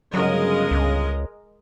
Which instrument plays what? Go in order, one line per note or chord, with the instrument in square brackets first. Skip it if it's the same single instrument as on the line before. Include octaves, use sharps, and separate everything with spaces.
[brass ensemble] G1 G2 C#3 [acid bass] F#3 [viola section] G#3 A#4 D#5
[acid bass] C#2